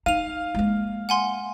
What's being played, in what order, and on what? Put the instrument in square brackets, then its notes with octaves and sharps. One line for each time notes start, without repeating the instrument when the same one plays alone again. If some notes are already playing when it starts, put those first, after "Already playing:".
[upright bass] D#4 [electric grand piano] F5 [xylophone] D#7 F7
[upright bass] G#3 A#3
[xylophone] F#5 G#5 C6